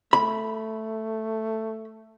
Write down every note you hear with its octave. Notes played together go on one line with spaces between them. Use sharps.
A3 B5